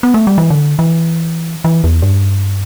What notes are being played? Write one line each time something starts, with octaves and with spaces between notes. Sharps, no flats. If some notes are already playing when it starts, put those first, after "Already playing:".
B3
A3
G3
E3
D3
E3
E3
E2
G2